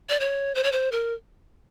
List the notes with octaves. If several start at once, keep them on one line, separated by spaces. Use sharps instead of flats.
D5
C#5
C5
C#5
C5
A#4